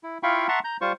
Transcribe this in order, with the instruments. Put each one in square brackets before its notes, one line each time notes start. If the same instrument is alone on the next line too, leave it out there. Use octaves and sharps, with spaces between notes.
[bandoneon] E4
E4 F4 F5 G5 B5 C#6
E5 F#5 A5 A#5 C6 C#6
A#5 G6
G3 F4 C5 C#6